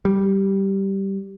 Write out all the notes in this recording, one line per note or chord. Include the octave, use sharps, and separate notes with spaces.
G3